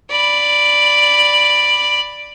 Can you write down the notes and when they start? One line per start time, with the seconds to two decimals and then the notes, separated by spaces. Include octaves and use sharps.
0.10 D5 B5